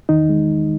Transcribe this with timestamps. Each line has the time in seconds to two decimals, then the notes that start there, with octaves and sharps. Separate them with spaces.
0.09 E2 D#3 D#4
0.29 G#3